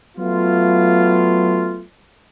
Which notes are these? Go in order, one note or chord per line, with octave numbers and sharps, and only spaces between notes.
F#3 A3 B3 F4